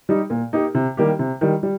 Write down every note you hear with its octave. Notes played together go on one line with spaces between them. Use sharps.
G3 D#4 G4
A#2
A#3 D#4 G4 A#4
C3
D#3 G3 A#3 G4
C3
D#3 G3
G3